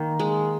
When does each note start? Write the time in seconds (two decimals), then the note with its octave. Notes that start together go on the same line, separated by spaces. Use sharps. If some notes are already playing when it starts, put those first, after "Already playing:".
Already playing: D#3 A#3
0.19 G#3